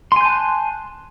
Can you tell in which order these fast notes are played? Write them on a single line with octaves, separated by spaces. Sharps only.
C6 G#5 G6 A5 F#6